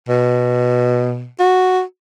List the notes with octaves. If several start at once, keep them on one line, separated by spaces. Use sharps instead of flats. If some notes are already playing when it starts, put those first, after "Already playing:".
B2
F#4